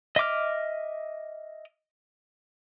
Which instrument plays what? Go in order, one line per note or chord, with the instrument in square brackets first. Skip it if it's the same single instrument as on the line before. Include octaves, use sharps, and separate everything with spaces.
[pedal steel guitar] D#5 E5 D6 F6